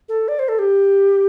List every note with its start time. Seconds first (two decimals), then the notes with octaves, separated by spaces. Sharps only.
0.09 A4
0.28 D5
0.39 C5
0.48 A4
0.59 G4